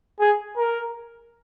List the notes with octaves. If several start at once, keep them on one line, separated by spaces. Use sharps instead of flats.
G#4
A#4